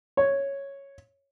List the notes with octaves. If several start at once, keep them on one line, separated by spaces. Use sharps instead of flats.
C#5